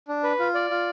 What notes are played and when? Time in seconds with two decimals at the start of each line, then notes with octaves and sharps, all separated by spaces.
0.08 D4
0.24 B4
0.39 F4
0.55 D5
0.70 F4